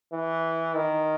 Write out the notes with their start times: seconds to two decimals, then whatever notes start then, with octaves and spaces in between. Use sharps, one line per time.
0.12 E3
0.74 D#3